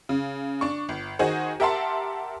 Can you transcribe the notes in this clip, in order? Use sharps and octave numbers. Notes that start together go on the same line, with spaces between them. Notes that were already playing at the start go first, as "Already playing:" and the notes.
C#3
D4 C#6
G1
D#3 D#4 F#4 G#4 C5
G4 A#4 E5 F#5 A5 C6